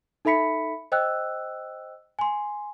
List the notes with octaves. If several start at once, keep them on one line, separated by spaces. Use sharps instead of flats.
D#4 A4 E5 B5 B6 C#7
C5 D#5 G5 E6 F#6
G#5 C6